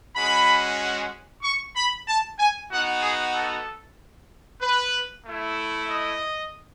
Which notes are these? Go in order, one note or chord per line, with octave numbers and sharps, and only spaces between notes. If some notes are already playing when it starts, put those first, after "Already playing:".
G#3 C#4 F#4 B5
C#6
B5
A5
G#5
B3 D#4 F#4 F#5
G#4
A4
B4
A3 E4
D#5